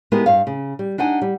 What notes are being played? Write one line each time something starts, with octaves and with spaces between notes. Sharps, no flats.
G#3 B3 E4 G4 G#4 A#4
G2 F5
C#3
G3
D4 D#4 F#5 G#5
G3